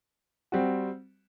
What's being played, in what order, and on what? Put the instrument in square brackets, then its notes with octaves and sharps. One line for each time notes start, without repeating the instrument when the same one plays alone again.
[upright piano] G3 C4 F#4